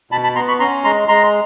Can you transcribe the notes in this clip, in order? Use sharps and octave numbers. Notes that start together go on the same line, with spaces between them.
B2 A5 B5
A5 B5
B3 A#5 C6
B5 C#6
C#4 A#5 C6
G#3 A#5 C6
G#3 A#5 C6